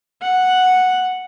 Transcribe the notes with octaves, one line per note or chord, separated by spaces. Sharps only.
F#5